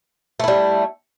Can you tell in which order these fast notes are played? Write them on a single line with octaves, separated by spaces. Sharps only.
A3 E4 G3